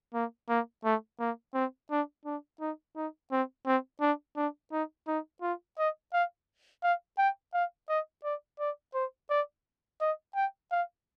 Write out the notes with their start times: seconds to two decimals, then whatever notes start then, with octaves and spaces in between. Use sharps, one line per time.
0.14 A#3
0.49 A#3
0.84 A3
1.19 A#3
1.54 C4
1.91 D4
2.25 D4
2.60 D#4
2.96 D#4
3.31 C4
3.66 C4
4.01 D4
4.36 D4
4.72 D#4
5.07 D#4
5.42 F4
5.78 D#5
6.13 F5
6.83 F5
7.18 G5
7.54 F5
7.89 D#5
8.24 D5
8.60 D5
8.94 C5
9.30 D5
10.01 D#5
10.35 G5
10.71 F5